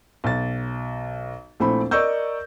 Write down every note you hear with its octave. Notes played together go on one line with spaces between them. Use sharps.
B1 A6
A#1 A3 C4 E4 B5
A#4 D5 D#5 C#6 E6 G6